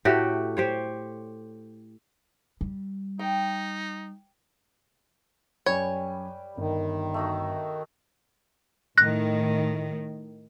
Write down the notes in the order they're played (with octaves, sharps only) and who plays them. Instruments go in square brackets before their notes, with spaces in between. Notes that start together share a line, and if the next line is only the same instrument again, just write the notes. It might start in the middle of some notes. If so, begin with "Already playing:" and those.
[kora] A2 A3 F#4 G4
G4 C5 C#5
[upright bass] G3
[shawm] D#4 [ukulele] G5
[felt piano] F#2 G#5 [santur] G3 B4 G5 [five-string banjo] C#5
[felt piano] G1 [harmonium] D#3
[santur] A3 D#4 F#4
[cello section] A2 D#3 [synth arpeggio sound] F#6 A#6